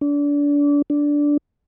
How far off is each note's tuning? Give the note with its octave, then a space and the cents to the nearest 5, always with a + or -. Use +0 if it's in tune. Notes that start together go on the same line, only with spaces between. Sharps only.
D4 -30
D4 -10